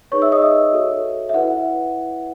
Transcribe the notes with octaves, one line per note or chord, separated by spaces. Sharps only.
D#4 G#4 B4 C#5 C#6
E5 E6
D#5 D#6
E5
F#4 A4 C#5
E5
E4 B4 F#5